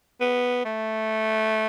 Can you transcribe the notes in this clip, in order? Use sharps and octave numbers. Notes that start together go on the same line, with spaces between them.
B3
A3